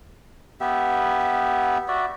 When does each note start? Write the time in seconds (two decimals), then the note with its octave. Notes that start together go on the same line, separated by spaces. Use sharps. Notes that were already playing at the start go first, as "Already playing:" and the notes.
0.61 B3 G4 E5
1.88 F#4 D5 E5